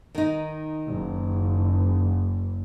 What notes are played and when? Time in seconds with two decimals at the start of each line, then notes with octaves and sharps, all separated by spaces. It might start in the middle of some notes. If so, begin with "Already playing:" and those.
0.15 D#3 D#4
0.86 F#1